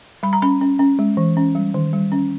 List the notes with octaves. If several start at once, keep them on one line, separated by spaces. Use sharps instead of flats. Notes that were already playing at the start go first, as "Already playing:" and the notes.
G3 B5
A#5
C#4 B5
C#4
C#4
G#3
E3
C#4
G3
D#3
G3
C#4